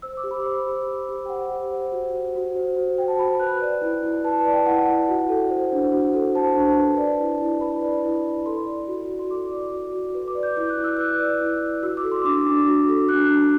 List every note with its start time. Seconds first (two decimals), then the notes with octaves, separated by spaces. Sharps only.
0.02 C5 E6
0.17 D6
0.24 G4
0.31 B5
0.46 C5
0.67 G4
0.88 C5
1.09 G4
1.26 G5
1.29 C5 F#5
1.50 G4
1.72 C5
1.92 F#4
2.14 C5
2.35 F#4
2.56 C5
2.76 F#4
2.97 C5 G5
3.08 A5
3.19 F#4 B5
3.39 B4 F#6
3.61 D5
3.82 E4
4.03 E4
4.24 B4 A5
4.39 A5
4.45 D5
4.53 G5
4.66 E4 F#5
4.88 E4
5.09 F#4
5.29 A4
5.50 C5
5.72 D4
5.93 F#4
6.14 A4
6.35 C5 A5
6.56 D4
6.78 B4
6.98 D5
7.19 E4
7.41 E4
7.61 B4 B5
7.82 D5
8.04 E4
8.25 E4
8.46 A4 C6
8.66 D5
8.88 F#4
9.09 F#4
9.19 C6
9.30 A4 D6
9.51 D5
9.72 F#4
9.93 F#4
10.14 B4
10.28 D6
10.35 D5
10.43 G6
10.57 E4 G6
10.70 F#6
10.78 E4
10.84 E6
10.97 B4 F#6
11.20 D5
11.41 E4
11.62 E4
11.83 F#4 E6
11.97 D6
12.04 A4
12.12 C6
12.25 D4 D6
12.46 D4
12.68 F#4
12.89 A4
13.09 D4 F#6
13.31 D4